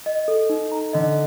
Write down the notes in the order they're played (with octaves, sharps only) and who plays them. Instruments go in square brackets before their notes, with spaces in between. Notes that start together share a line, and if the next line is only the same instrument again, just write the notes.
[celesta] D#5
A4
D#4
A#5
[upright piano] D3 [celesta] D#5